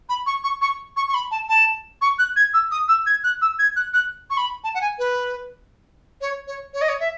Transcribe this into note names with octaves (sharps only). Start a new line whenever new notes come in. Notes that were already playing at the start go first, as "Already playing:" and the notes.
B5
C#6
C#6
C#6
C#6
C#6
B5
A5
A5
C#6
F#6
G#6
E6
D#6
E6
G#6
F#6
E6
G#6
F#6
F#6
C#6
B5
A5
F#5
G#5
B4
C#5
C#5
C#5
D#5
C#5
E5